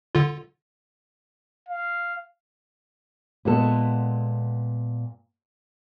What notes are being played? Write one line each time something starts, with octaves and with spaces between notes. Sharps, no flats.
D3 F4
F5
A#2 G#3 B3 A4